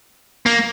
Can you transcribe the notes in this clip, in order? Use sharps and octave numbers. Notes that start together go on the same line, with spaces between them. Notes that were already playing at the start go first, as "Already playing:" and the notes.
A#3